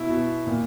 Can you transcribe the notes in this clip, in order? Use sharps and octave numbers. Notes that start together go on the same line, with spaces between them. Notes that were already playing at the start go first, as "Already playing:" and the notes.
Already playing: B2 E4
B2
A#2